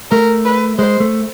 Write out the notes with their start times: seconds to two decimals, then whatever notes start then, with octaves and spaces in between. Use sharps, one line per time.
0.11 A3 A#4
0.45 B4
0.78 G#3 C5
1.00 A3